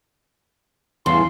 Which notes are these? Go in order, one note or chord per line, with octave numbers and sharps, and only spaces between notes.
E2 G2 C#3 C6